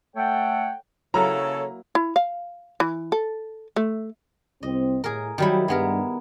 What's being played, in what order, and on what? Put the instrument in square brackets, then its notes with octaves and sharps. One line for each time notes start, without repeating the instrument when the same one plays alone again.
[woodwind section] A3 A4 C#5 F#5 G5
[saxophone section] C#3 A4 [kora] F#3 A#3 E4 [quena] C#5 [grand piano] A#5
[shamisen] E4
F5
E3
A4
A3
[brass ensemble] C2 C4 [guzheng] D#5
[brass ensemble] A2 [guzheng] G#4 A#4
[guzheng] D#3 G3 E4 [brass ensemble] F#3 F#4
[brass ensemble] G2 [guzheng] G#3 B3 A#4